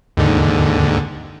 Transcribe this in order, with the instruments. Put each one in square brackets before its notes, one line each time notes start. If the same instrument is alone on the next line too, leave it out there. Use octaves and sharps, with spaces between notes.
[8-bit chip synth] D#2 G#2 D3